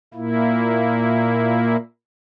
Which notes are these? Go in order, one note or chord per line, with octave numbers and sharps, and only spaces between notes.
A#2 A#3 E4